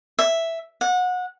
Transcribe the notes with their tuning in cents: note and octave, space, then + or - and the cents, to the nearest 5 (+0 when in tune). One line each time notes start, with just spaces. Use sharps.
E5 +0
F#5 -25